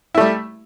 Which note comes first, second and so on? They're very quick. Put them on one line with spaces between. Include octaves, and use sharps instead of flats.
E4 A3 G3